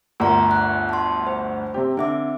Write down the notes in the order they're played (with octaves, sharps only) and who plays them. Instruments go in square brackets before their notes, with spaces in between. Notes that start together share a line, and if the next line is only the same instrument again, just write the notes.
[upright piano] G1 D2 [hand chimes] A#4 A#5 C6
[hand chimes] F#6
A5 C6
C5
[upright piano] C3 C4 G4
[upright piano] D3 [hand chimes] C4 E5 D6